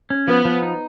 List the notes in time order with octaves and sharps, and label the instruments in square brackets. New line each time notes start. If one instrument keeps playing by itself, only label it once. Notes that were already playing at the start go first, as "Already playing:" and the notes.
[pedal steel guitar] C#4
[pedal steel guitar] F3 [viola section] B3
[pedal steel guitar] F3
D#4